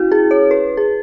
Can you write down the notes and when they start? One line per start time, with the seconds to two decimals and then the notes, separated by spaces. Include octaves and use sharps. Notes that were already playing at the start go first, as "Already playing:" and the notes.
Already playing: C#4 E4 F#4
0.12 G#4
0.31 C#5
0.51 B4
0.77 G#4